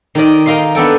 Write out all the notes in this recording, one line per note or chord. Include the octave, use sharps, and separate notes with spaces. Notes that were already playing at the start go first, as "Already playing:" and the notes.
D#3 A#4 D5 D#5
A#4 D#5 F5 G5 C6
B3 D4 A4 G5